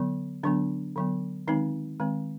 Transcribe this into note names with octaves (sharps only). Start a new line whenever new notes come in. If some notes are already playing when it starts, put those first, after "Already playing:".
Already playing: D3 F#3 B3
D3 F#3 B3 D4
D3 F#3 B3
D#3 G#3 C4 D#4
D#3 G#3 C4